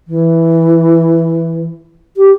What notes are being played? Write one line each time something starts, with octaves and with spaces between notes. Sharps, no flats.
E3
G4